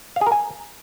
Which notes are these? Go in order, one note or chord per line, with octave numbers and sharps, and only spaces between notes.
F5
G#4
A#4
G#5